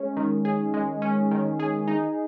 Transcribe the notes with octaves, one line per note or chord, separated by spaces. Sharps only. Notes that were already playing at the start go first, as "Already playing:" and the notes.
Already playing: G#3 C#4
D#3
G#4
G#3
C#4
D#3
G#4
D#4